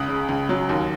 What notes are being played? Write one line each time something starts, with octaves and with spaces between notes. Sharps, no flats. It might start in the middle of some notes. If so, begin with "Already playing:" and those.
Already playing: C#2 D#6 F#6
C#3
C#2
F#3
D#2